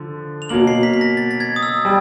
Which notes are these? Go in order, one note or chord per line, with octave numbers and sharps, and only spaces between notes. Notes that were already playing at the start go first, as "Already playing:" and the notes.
Already playing: D3 F3
F7
B2 F#3 A#3 F#7
C7
B6
B6
A#6
A6
A6
G#6
D#6
E6
G3